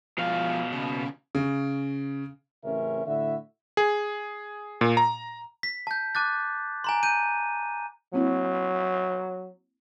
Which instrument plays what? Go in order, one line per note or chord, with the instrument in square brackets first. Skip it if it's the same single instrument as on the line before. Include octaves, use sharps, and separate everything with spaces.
[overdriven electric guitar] B2 F5 [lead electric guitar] F3 B3
[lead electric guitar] D#2 C#3
[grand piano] C#3
[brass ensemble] A1 C#3 C4 C#4 A#4 E5
A2 D3 E4 F#4 E5
[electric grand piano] G#4
A#2
A#5
[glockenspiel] B6
A5 G6
A5 D6 F#6 A6
G#5 A#5 C6
G6 D#7
[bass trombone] F#3 [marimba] A#3 C4 E4